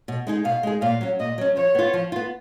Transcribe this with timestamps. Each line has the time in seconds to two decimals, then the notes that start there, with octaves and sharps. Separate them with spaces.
0.08 B2
0.27 G#3 D#4 G#4
0.45 B2 F5
0.63 G#3 D#4 G#4
0.82 A#2 F5
1.01 F#3 C#4
1.20 A#2 D#5
1.38 F#3 C#4
1.56 F3 C#5
1.75 B3 F4
1.94 F3
2.12 B3 F4